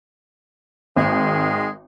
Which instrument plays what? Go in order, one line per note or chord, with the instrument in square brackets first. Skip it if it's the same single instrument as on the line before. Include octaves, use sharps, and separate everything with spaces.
[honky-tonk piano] G#1 [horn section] D#3 G#3